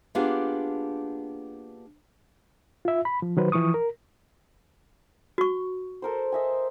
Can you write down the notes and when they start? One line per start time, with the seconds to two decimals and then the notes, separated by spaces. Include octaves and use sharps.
0.15 A#3 B3 D4 F4 G4 G#4
2.85 F4 E5
3.05 B5
3.22 F3
3.37 D#3 F#3 B4 C5
3.52 E3 F3 C#6 D#6
3.74 A#4
5.38 F#4 C#6
6.02 A4 A#4 C5
6.32 D#5 E5 G#5